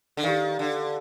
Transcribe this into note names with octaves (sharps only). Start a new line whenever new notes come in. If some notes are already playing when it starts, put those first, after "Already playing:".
D3
D#3 G4 D5 F5
D3